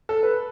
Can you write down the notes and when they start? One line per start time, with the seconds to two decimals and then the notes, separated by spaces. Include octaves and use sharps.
0.09 A4
0.23 B4